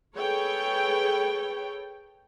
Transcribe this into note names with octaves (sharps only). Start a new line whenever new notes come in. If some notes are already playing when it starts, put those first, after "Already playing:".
G#4 A4 B4 C#5 G5